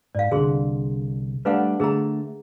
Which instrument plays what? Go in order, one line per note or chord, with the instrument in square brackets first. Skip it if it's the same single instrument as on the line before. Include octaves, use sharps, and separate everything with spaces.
[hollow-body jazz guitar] G#2 [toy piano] D5 F5
[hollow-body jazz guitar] C2 G#2 D3 [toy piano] G#4 C6
[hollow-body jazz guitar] G3 A3 D4 [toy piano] B4 F5 F#5
[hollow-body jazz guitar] D3 A3 [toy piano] G#4 A#5